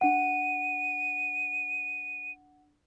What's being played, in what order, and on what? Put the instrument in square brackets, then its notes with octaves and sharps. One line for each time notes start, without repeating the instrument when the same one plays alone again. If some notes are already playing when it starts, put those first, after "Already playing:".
[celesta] D4 F#5 [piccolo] D#7